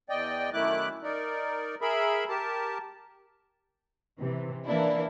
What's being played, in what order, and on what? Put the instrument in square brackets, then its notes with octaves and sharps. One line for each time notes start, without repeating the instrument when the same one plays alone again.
[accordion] E2 D5 D#5 G5
F#2 D#3 A3 E4 D6 F#6
D#4 A#4 D5
G#4 A#4 E5 B5
G4 A#4 A5
[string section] C3 E3
E3 A#3 D4 E4